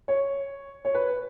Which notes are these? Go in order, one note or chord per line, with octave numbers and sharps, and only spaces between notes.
C#5
C#5
B4